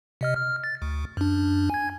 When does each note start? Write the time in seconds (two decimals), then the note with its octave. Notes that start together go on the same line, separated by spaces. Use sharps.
0.21 C3 D#5 F6
0.37 F6
0.64 A6
0.82 D2
1.17 F#2 D4
1.70 G#5 G#6